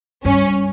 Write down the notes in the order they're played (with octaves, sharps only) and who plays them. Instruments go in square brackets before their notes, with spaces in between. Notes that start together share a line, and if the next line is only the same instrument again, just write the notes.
[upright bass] G2 [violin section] C#4